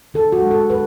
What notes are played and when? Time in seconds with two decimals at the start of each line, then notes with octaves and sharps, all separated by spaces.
0.14 D3 A4
0.32 F#4
0.42 G#3
0.51 A4
0.70 D3 B4